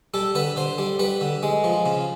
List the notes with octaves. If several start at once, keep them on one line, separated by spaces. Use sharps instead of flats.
G3 A4
D3 B4
D3 C5
G3
G3 B4
D3
G#3
F3
C#3